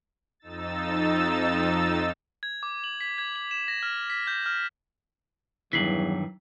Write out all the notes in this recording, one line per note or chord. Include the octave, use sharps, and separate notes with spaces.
F2 D#4 E6 A6
G#6
D6
F#7
B6
G#6
F#7
E7
A#6
F6
B6
G6
F6
E2 G2 D#3 E3 F#3 B6 C7 F#7